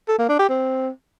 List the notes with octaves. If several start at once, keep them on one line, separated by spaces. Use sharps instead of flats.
A4
A#3
D4
G4
C4